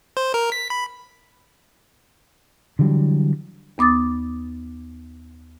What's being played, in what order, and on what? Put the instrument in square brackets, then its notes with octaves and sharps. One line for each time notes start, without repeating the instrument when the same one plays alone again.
[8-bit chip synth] C5
A#4
B6
B5
[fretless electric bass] D3 E3 F#3 G3
[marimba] D#2 B3 D6 D#6 A6